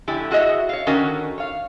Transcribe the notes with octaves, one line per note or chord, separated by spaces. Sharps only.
F2 D3 A3 E4 G4 G#5
E4 F#4 G#4 A#4 D#5 E5
C#5 F5
D3 D#3 C#4 F#4 A#4 G#5
C#5 F5